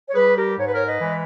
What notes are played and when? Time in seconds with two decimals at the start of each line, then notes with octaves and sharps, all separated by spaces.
0.08 C#5
0.14 G3 G#4 B4
0.37 G4 A#4
0.58 G#2 C#5
0.67 B4
0.74 A#4 C#5
0.87 B4 D#5
1.01 E3 G#3